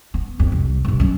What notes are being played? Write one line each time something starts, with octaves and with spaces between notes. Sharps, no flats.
B3
F2
C2
G1 C2
F#3 C#4